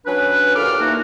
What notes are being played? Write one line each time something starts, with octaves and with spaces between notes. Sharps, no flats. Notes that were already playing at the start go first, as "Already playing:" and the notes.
F#3 C#4 D4 B4
D#2 A#2 A4 D6 F6
A#2 E3 A#3 D#4 F#4